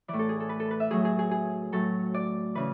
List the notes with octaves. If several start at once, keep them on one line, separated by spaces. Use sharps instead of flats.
A2 E3 D5
A4
G#4
A4
B4
A4
B4
E5
A2 F#3 G#4
G#4
G#4
G#4
A2 F#3 A4
D5
C#3 E3 B4